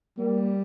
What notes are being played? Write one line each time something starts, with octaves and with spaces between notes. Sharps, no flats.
G3 A#3